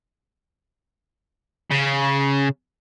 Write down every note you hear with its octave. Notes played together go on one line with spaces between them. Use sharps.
C#3